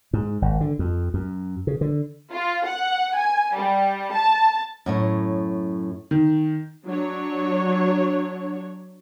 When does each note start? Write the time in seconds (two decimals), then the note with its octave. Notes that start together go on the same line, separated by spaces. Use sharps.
0.13 G#2
0.42 G#1
0.61 D3
0.79 F2
1.14 F#2
1.67 C#3
1.81 D3
2.34 F4
2.67 F#5
3.16 G#5
3.56 G3
4.13 A5
4.86 F#2 A2 C#5
6.11 D#3
6.87 F#3 D4 C#5